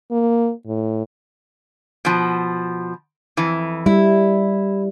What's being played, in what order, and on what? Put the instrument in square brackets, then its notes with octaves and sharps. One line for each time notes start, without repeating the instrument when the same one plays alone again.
[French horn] A#3
A2
[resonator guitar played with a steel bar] B2 F3
F2 E3
[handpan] G3 [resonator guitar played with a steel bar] E4